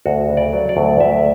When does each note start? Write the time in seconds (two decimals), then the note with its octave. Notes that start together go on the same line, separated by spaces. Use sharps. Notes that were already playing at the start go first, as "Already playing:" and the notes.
0.06 D2 F#4
0.29 C#3
0.37 D5
0.53 F#3
0.69 D5
0.77 D2
1.00 D2 E5